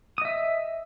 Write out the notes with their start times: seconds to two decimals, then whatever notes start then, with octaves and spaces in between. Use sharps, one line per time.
0.18 D#6
0.22 D#5
0.25 E5